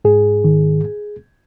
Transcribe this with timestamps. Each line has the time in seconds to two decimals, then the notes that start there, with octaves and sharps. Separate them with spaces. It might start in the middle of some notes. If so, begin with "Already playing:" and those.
0.05 G#2 G#4
0.44 D#3